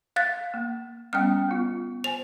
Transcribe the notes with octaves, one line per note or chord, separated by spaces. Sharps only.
F5 F#6 A6
A#3
G3 B3 C#4 G5 F6
B3 F4
C5 G#5 F7